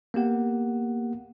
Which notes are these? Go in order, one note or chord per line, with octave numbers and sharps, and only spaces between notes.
A#3 B3 G4 F#5